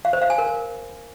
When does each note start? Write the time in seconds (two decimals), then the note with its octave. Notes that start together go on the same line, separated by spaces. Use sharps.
0.05 F5
0.13 C5
0.22 F5
0.30 G#5
0.38 A#4